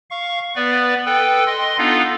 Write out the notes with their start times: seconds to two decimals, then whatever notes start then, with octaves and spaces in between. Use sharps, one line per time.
0.10 F5 C#6
0.56 B3 B4 D5
1.06 A4 B4 G5
1.46 D#5 C6
1.78 B3 D4 D#4 F4 A4 F5